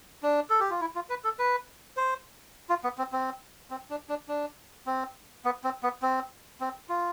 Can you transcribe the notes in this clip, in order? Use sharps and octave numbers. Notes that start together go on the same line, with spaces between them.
D4
A4
G4
F4
E4
F4
B4
A4
B4
C5
F4
B3
C4
C4
C4
D4
D4
D4
C4
B3
C4
B3
C4
C4
F4